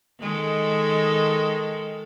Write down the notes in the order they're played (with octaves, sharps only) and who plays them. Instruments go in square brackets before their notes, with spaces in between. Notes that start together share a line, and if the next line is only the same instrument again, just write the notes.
[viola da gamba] D#3 G#3 A4